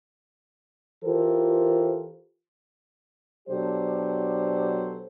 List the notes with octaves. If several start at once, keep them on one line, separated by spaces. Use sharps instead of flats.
E3 F4 G4 A4 A#4 C5
B2 F#3 D4 G4 A4 C5